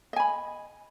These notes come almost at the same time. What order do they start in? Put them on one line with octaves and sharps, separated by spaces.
D#5 G#5 B5